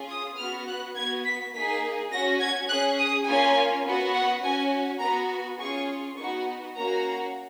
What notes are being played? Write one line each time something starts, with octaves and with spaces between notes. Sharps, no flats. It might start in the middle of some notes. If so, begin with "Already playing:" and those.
Already playing: C#4 F4 G#4
D#6
B3 F#4 F6
F#6
B3 F#4 G#6
B6
A#3 D#4 G#4 B6
C#4 F#4 A#6
G#6
C#4 G#4 F#6
D#6
A#3 C#4 F4 G#5
B3 F#4
F#5
C#4 F#4 G#5
B3 F#4 A#5
C#4 F4 G#4 C#6
B3 D#4 F#4 C#6
A#3 C#4 F#4 A#5